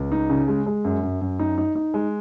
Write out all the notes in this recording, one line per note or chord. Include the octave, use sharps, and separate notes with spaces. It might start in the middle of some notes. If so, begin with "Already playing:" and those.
Already playing: C#2
D#4
C#3
G#3
G#3
F#2
F#2
F#2
D#4
D#4
D#4
G#3